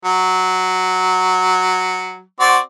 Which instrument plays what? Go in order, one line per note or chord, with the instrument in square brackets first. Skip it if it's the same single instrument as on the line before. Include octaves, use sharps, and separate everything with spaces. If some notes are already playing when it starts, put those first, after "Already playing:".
[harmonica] F#3
C4 F#4 D5